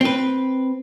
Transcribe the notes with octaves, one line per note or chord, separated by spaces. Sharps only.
C4 B4